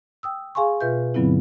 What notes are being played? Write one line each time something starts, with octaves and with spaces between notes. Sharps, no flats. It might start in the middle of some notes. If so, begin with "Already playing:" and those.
G5 D#6 E6
G#4 F5 G#5 C6 C#6
B2 F4 B4 E5 G6
G2 D3 F#3 B3 C4 E4